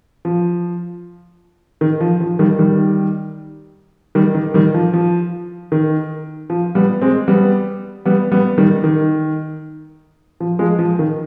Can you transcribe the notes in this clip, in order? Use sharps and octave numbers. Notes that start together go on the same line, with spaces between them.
F3
D#3
F3
F3
D#3 G3
D#3 G3
D#3 G3
D#3
D#3 G3
F3
F3
D#3
F3
G3 B3
G#3 C4
G3 B3
G3 B3
G3 B3
D#3 G3
D#3
F3
F3 G#3
F3
D#3